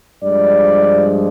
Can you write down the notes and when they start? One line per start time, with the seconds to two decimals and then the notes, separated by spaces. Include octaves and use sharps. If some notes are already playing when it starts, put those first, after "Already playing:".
0.23 G2 F3 G#3 D5